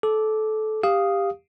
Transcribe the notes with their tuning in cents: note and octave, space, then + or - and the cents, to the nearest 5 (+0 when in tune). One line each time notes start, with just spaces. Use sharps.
A4 -20 D6 +0
G4 +15 F5 +0 D#6 +0